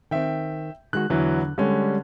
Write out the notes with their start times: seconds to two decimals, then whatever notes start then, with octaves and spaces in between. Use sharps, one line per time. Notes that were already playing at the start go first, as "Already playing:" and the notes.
0.11 D#3 C4 E5 G5
0.93 D#3 G#3 F#4 F#6
1.10 E2 D3 E3 F#3
1.58 D3 G3 G#3 C#4